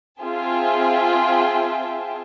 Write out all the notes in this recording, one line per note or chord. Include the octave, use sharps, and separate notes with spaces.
C4 F4 G#4 E5 G5 A5